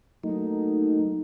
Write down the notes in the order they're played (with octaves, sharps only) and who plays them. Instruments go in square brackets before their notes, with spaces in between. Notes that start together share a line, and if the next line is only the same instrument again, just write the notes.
[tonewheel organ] F#3 A3 A#3 [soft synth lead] D#4